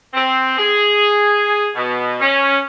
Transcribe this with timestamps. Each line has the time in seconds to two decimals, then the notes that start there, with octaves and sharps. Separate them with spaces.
0.14 C4
0.58 G#4
1.76 B2
2.21 C#4